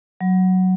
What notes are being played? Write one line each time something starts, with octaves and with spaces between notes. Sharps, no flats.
F#3